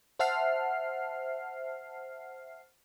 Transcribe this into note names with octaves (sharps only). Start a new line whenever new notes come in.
C5 E5 F#5 A5 F6 C7